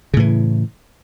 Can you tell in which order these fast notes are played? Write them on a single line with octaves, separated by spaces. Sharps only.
C#3 A2 E3